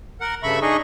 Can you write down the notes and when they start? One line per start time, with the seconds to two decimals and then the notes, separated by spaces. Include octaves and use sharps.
0.21 A#4 F#5
0.43 G2 C#3 A3 E5 B5 C#6
0.62 D4 D#4 G#4 D#5 C#6